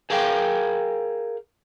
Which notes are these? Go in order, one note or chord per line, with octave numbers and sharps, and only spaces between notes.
G#4 A#4 F5 G5